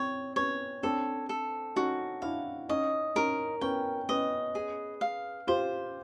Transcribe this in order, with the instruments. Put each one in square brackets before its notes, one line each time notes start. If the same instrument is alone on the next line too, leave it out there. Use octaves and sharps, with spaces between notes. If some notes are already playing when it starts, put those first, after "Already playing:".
Already playing: [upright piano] C4 [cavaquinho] C#5
[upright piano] B3 C#4 [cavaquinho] C#5
[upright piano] C4 D4 [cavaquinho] A4
[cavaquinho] A4
[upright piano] C#4 D#4 [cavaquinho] F#4
[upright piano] D4 E4 [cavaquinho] F5
[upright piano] C#4 D#4 [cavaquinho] D#5
[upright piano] C#4 D#4 [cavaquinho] A#4
[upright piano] B3 C#4 [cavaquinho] G5
[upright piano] B3 C#4 [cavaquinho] D#5
[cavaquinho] G#4
F5
[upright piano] F4 G4 [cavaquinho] C5